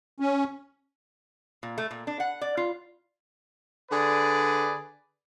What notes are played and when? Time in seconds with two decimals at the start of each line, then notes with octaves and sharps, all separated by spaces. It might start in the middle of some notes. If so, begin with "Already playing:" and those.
0.20 C#4
1.63 A#2
1.78 A3
1.91 A#2
2.07 D4
2.20 F#5
2.41 D5
2.57 F4
3.91 D3 G#4 B4 D5